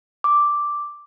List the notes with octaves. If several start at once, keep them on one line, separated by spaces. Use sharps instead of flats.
D6